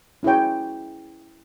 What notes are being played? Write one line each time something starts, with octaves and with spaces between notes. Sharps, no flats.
C#4 E4 G#4 C#5 G5